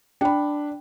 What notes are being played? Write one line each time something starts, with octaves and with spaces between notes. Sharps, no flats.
D4 G5 B5